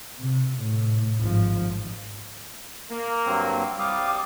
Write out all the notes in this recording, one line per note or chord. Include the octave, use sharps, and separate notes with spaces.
C3
A2
G#1 F3
A#3
G2 F#3 C4
C2 G3 F5 D6 D#6